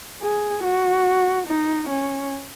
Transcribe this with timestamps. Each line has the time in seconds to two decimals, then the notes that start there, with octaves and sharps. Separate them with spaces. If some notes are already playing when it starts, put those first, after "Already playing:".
0.22 G#4
0.64 F#4
1.47 D#4
1.89 C#4